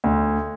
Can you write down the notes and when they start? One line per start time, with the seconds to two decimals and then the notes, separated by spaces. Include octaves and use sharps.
0.04 D2